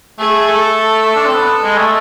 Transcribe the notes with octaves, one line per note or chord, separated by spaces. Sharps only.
A3 G#4
A3 A4
D4
C4
B3
G#3
A3